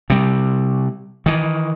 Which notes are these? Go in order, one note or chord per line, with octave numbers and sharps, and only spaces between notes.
C3 G3
D#3 E3